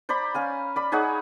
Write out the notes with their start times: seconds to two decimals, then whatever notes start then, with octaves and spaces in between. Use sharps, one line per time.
0.09 C5 D5 A#5 B5
0.34 C#4 F5 G#5
0.76 D5 B5
0.92 D#4 G#4 C#5 F#5